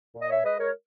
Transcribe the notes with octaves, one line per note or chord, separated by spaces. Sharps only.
A#2
D#5
C#5 E5
G#3 B4 D#5
A#4 C#5